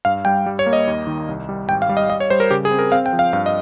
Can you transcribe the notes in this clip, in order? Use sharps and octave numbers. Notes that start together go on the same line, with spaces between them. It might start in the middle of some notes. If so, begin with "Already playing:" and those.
G2 F5
G3 G5
G3
C#5
A#3
D#5
D#2
D#3
C2
G3
G#1 G5
F5
G3
D#5
G3 D#5
C#5
G3 C5
A#4
C#3 G4
G#4
C4
A#4
C4 F5
G5
F3
F5
G2 F5
D#5